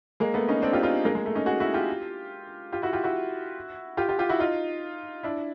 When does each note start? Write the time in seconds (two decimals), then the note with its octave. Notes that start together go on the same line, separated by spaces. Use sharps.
0.20 G#3 A#3
0.34 A3 B3
0.48 C#4 D#4
0.62 C4 D4
0.73 F4 G4
0.83 D#4 F4
1.05 G#3 A#3
1.15 G#3
1.26 A3
1.35 C#4 D#4
1.46 F#4 G#4
1.60 E4 F#4
1.74 F4 G4
2.72 F4 G4
2.82 E4 F#4
2.93 F4 G4
3.04 E4 F#4
3.97 F4 G4
4.09 F4 G4
4.19 F4 G4
4.29 E4 F#4
4.39 D#4 F4
5.23 D4 E4